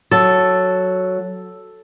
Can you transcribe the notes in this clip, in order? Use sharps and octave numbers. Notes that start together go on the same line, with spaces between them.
F#3 A4